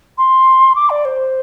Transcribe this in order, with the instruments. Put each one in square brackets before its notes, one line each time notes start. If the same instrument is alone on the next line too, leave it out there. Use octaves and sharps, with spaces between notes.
[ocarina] C6
D6
D5
C5